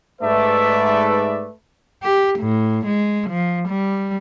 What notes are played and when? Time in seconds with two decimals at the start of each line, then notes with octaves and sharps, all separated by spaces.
0.21 G#2 A3 B4 D5 E5
2.03 G4
2.40 A2
2.87 G#3
3.30 F3
3.69 G3